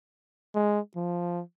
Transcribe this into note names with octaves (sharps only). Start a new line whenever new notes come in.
G#3
F3